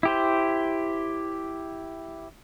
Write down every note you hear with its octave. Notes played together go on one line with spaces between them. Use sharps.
E4 G4 C5